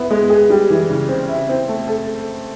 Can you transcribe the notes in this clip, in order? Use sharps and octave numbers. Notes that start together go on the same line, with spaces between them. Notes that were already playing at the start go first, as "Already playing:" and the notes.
Already playing: B3 E4
G#3
G#4
G3
E3
C#3
C4
E4
C4
A3
A4